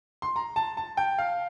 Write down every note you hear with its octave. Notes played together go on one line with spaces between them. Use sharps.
C6
A#5
A5
A5
G5
F5